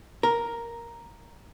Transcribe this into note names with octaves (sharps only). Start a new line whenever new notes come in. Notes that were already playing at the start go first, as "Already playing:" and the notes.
A#4